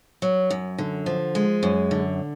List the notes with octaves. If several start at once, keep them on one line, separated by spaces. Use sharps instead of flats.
F#3
F#2
D3
F3
G#3
F#2
D3